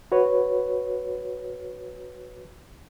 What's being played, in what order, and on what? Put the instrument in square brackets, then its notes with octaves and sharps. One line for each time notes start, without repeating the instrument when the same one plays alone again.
[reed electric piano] F#4 B4 C#5